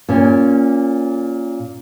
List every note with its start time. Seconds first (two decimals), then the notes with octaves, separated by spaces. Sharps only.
0.09 A#2 C#4